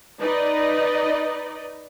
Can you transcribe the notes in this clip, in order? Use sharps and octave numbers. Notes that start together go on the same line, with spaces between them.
D#4 B4 D5 D#5